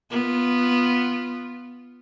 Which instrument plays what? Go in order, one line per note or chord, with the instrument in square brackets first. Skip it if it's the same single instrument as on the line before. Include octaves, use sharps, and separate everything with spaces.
[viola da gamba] B3 F4